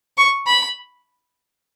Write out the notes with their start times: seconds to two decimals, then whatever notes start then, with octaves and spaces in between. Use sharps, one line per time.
0.18 C#6
0.47 B5